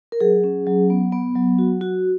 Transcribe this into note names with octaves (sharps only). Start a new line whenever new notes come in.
A#4
F#3 G#4
C#4
F#3
B3
B3
F#3
F#4
F#4